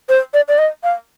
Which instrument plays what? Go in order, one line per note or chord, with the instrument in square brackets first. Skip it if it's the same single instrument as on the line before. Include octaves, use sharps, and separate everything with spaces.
[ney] C5
D5
D5
D#5
F5